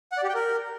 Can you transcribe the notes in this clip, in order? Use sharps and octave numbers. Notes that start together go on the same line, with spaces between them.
F#5
D5
G4
G5
A#4